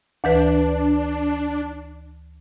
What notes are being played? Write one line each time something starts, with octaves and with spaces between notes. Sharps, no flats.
D2 E3 D4 B4